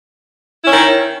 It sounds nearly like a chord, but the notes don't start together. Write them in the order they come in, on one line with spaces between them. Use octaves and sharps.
E4 C#4 D#3